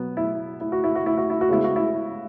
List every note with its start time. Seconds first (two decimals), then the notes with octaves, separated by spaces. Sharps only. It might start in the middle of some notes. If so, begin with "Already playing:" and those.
Already playing: B2 F#3 B3
0.17 E4
0.61 E4
0.72 F#4
0.84 E4
0.95 F#4
1.06 E4
1.18 F#4
1.30 E4
1.41 F#4
1.49 C#3 G#3 B3 E4
1.64 F#4
1.76 E4